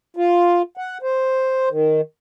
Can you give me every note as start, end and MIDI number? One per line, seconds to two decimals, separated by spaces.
0.17 0.62 65
0.77 0.98 78
1.02 1.69 72
1.70 2.01 51